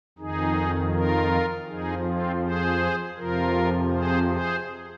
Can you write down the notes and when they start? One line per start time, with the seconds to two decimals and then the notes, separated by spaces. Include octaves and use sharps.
0.18 F2 D#3 D#4 G#4
0.93 F4 A#4
1.68 F2 F3 D#4 G#4
2.05 C4 F4
2.43 G#4 C5
3.17 F2 C3 F3 F4 A#4
3.93 G#4 C5
4.30 G#4 C5